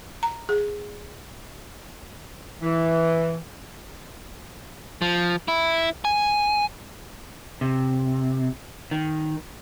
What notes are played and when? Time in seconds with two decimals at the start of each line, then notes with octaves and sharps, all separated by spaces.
0.23 A#5
0.49 G#4
2.62 E3
5.02 F3
5.48 E4
6.05 G#5
7.61 C3
8.91 D#3